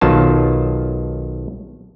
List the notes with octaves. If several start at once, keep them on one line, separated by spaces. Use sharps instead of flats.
B1 D#3 F#3 F4 A5